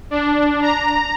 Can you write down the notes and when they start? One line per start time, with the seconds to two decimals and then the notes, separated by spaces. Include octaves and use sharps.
0.11 D4
0.62 A#5